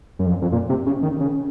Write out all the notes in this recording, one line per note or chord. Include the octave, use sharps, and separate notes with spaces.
F#2
F2
F2
A#2
C3
C#3
D#3
C#3